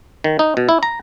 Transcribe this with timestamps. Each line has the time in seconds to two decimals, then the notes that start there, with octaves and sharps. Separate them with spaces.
0.24 D#3
0.39 D#4
0.57 B2
0.69 E4
0.83 A#5